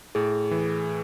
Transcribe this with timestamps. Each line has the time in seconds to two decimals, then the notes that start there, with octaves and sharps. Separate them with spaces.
0.15 A2 G#4
0.51 E3